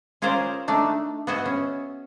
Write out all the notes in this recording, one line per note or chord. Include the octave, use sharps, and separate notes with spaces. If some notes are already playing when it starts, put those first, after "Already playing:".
C#4 F4 G#4 A#4 C5 D5
A3 D4 D#4
B3 F#4 G#4 D#5 E5 F#5
C#4